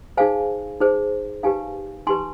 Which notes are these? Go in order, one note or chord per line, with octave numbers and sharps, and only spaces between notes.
D#4 G#4 C5 F5 G#5
D#4 G#4 C5
D#4 G4 B4 F5 G#5
D#4 G4 B4 G#5 C6